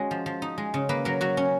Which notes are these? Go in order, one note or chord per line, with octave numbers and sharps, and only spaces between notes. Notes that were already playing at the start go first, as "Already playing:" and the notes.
Already playing: G#3 C#4 F#4
F3
F3
D#4
G#3
C#3
A#3 B4
F#3 A#4
F#3 F#4
C#4